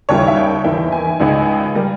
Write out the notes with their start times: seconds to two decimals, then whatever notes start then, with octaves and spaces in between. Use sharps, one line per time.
0.09 D#2 C#3 G3 A#3 E4 C#5
0.28 E5
0.37 G5
0.64 E2 D#3 A#3 E4 G5
0.92 G#5
1.20 C#2 C#3 G#3 D#4
1.75 G3 A#3